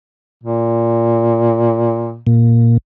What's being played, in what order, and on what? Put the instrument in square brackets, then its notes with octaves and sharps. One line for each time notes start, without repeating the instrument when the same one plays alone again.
[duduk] A#2
[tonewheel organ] A#2